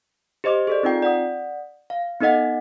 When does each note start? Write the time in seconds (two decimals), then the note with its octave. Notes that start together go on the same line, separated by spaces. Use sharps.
0.44 G4 C5 D#5 D6
0.67 G#4 A4 D5
0.83 C4 D#4 F4 G5
1.02 D5 F#5 D#6
1.90 F5
2.20 B3 D#4 A4 D#5 F#5 A6